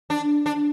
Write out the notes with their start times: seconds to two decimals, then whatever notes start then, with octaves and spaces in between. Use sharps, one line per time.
0.10 D4
0.46 D4